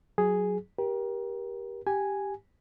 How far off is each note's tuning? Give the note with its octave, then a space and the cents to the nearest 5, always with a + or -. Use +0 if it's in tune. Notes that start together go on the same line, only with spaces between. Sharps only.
F#3 +0 G#4 +0
G4 +0 A#4 +30
G4 +0 G#5 +0